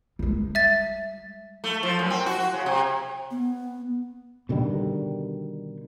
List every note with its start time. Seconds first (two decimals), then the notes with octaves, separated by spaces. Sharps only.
0.19 G3 G#3
0.55 E5 A6
1.64 A3
1.83 F3
1.99 F#2
2.10 C4
2.26 F#4
2.38 F#4
2.53 C#3
2.66 C3
3.31 B3
4.49 B2 D3 D#3 G3